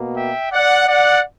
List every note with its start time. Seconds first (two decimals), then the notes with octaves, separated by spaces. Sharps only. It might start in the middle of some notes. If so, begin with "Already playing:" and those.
Already playing: B2 A#3
0.16 E5 G5
0.52 D5 F#5
0.88 D5 F#5